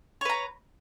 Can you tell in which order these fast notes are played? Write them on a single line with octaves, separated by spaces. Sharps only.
C#5 B4 A#5